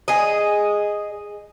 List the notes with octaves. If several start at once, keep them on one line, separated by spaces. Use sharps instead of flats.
G#4 D#5